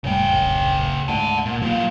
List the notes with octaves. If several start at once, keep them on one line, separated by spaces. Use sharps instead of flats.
F1 A2 C#3 G3 G5
D1 A#1 F#2
D2 G#2 F#5 A5
A#2
G2 F#3 A#3 F4